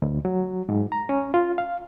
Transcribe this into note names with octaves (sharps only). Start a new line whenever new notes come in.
D2
F#3
G#2
A#5
C#4
F4
F5